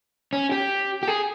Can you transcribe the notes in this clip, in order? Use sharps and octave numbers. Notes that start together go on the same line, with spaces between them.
C#4
G4
G4
G#4